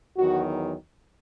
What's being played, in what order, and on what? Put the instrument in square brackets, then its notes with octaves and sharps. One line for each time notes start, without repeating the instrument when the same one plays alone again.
[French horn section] E2 D#3 F#3 F#4